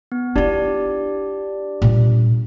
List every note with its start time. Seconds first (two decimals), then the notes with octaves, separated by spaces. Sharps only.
0.12 B3
0.36 D4 E4 F4 G4 D5
1.82 A#2 G3